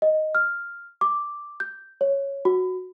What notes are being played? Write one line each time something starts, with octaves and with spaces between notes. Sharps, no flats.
D#5
F6
D6
G6
C#5
F#4